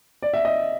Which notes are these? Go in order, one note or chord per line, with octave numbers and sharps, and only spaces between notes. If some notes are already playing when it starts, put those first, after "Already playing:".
D5
E5
D#5